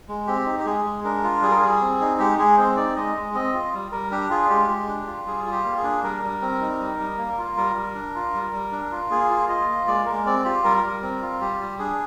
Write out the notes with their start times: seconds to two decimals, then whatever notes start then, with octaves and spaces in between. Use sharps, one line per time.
0.09 G#3
0.27 C4 G4
0.46 D#4
0.59 G4
0.65 G#3 G#4
0.85 G#3
1.04 D4 A#4
1.24 F4
1.42 G3 G#4
1.51 A#4
1.59 G3 G#4
1.81 C4
2.01 D#4
2.19 G#3 G4
2.38 G#3 G#4
2.57 C4 C5
2.77 D#4 D5
2.96 G#3 D#5
3.15 G#3
3.34 C4 D#5
3.53 F4
3.73 G3
3.91 G3 A#4
4.11 D4 G4
4.30 F4 G#4
4.49 G#3 G4
4.69 G#3
4.88 D4
5.07 F4
5.26 G3 G#4
5.46 F4
5.51 G4
5.65 A#3
5.77 G#4
5.83 D4
6.03 G3 A#4
6.23 G3
6.42 C4
6.61 D#4
6.80 G3
7.00 G3
7.18 A#3
7.38 F4
7.56 G3 A#4
7.75 G3
7.95 D4
8.15 F4
8.34 G3
8.52 G3
8.72 D4
8.91 F4
9.10 A#3 G#4
9.30 F4
9.49 F4 D#5
9.68 A#3
9.87 G#3 D5
10.06 G#3 A#4
10.26 C4 D5
10.45 F4 G4
10.64 G3 A#4
10.84 G3
11.02 C4
11.21 F4
11.41 G3 G4
11.60 G3
11.79 D4 G#4